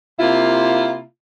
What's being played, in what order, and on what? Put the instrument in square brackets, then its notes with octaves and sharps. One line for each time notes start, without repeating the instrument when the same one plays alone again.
[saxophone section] C3 A#3 E4 F4